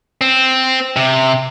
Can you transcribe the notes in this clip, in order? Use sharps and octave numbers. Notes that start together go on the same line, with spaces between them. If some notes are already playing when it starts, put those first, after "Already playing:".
C4
C3